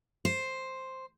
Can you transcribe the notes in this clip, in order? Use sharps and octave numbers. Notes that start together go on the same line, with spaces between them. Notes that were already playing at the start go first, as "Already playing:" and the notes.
C5